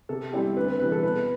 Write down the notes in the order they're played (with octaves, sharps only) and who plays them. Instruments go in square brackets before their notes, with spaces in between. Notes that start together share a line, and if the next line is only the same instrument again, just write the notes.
[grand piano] C3 [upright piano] A4
[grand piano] G3 C4 E4 G4
[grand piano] D2 [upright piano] B4
[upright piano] B4
[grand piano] C3 E3 G3 [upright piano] B4
[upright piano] A4
[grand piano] B2 [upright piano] B4